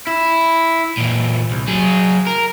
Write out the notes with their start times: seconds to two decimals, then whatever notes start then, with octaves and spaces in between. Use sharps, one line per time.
0.07 E4
0.97 A#2 E3
1.51 C2
1.68 F#3 G#4
2.27 A#4